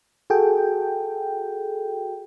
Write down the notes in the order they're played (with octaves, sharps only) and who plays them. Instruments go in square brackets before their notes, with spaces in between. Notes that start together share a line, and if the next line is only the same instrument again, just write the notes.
[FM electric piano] F#4 G#4 A4 G5